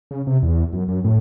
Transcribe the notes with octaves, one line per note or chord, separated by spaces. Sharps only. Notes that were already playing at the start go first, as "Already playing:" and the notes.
C#3
C3
E2
F#2
F#2
A2